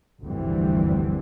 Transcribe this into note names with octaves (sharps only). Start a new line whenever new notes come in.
F1 D2 G2 E3 G3 C4